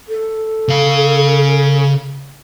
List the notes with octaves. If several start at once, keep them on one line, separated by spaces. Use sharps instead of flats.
A4
C#3 F5